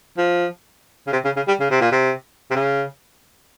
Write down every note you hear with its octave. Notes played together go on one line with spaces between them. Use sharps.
F3
C#3
C3
C#3
C#3
G3
C#3
C3
A#2
C3
C3
C#3